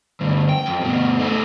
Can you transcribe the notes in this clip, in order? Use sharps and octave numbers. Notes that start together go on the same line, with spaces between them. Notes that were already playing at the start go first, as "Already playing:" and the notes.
D2 G2
G5
F2
G2 B2
A3 D#4